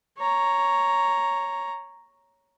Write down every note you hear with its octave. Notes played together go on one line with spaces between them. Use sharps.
C#5 A#5